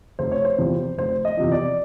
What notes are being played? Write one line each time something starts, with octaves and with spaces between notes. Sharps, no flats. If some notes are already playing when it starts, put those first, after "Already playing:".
F1 C5
C#5
C5
E2 C3 F3
F1 C5
D#5
E2 C3 F3
D5